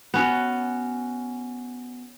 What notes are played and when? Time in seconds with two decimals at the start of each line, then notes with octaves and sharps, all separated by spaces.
0.14 B3 C#4 F#4